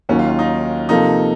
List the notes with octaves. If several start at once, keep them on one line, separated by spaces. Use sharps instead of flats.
D#2 D#3 F#3 C#4
F4
F4
D#4
C3 F3 A#3 D#4 F4 A4